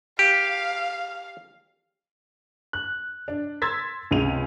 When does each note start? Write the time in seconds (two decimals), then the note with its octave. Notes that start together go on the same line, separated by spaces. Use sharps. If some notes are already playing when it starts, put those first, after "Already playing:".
0.19 G4 F5
2.73 F#6
3.28 D4
3.62 C6 E6 G#6 A6 B6
4.11 C#2 C3 G#3 D#7 F7